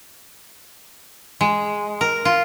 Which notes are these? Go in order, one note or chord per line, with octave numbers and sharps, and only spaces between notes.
G#3
A#4
F4